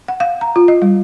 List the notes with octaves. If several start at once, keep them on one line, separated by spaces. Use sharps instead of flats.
F#5
F5
A#5
F4
D#5
G3